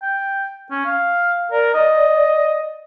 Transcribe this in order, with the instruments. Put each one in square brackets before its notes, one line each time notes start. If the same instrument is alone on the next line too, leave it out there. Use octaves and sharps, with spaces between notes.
[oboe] G5
C#4
F5
[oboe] A#4 [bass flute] D5
[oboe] D#5